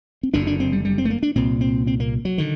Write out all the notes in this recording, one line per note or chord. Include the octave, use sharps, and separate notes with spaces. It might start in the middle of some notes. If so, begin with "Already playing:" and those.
C4
F#1 F#2 D3 D4
D4
C4
G3
G3
C4
A3
A#3
D4
C2 A#2 C4
C4
C4
A#3
F#3
D3 D#3